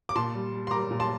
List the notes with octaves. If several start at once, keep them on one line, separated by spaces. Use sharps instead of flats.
D6
A#2 A5 C6
G3
G3
C6
G3 A#5 D6
A#2
A5 C6